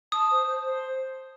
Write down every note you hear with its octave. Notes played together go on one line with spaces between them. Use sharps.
A5 D#6
C5
C5
C5